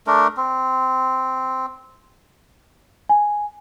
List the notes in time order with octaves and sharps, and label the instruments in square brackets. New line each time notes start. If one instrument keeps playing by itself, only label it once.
[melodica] A3 D4 A#4
C4
[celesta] G#5